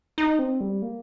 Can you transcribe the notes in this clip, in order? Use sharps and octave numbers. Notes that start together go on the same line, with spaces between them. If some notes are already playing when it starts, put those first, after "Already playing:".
D#4
C4
G3
A#3